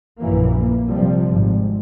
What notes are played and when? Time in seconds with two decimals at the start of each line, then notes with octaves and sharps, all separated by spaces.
0.19 A#1 F#2 E3 A#3
0.56 A#3
0.88 C3 F3 G3
1.29 G#1